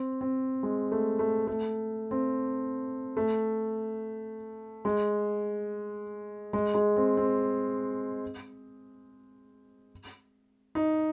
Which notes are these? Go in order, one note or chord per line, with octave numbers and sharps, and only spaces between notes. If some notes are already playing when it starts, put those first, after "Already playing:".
Already playing: C4
C4
G#3
A3
A3
A3
C4
A3
G#3
G#3
G#3
C4
C4
D#4